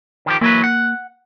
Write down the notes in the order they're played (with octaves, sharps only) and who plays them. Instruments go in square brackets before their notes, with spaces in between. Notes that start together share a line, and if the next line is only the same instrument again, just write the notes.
[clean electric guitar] D#3 F3 G4
[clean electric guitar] E3 F#3 B4 [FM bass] A#3
[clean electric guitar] F#5